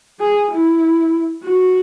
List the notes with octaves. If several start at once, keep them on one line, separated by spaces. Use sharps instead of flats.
G#4
E4
F#4